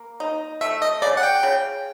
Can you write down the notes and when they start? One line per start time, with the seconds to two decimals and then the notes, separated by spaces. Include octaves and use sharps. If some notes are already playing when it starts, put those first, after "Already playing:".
Already playing: A#3
0.20 D#4
0.61 A3 E5
0.82 D#5
1.02 C#3 D5
1.17 F#5
1.23 G5
1.43 C#3